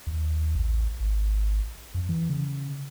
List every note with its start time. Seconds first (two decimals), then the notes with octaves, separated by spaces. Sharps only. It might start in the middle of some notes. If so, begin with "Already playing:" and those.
0.07 D#2
0.55 A1
1.00 G#1
1.94 F2
2.09 E3
2.30 C#3